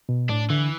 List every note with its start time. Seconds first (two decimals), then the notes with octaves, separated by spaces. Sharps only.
0.09 B2
0.30 A2 D4
0.50 D3 E3